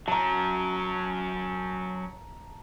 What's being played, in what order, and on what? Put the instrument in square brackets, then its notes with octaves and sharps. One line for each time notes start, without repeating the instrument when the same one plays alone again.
[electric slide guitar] F#3 C#4 [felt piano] A5 A#5